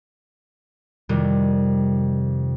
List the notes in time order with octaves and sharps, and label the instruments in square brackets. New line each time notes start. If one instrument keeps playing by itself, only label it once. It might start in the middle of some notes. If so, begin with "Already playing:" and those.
[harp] F2 C3 D#3 G3